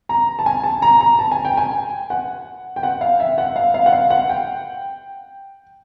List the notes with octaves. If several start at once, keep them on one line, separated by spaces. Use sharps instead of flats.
A#5
A5
G#5
A5
A#5
A#5
A5
G#5
G5
G#5
F#5
G5
F#5
F5
E5
F#5
F5
F5
F#5
F5
F#5
G5